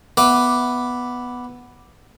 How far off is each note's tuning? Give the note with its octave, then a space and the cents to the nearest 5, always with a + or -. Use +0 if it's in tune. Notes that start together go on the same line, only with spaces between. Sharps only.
B3 +0 E5 +0 D6 +0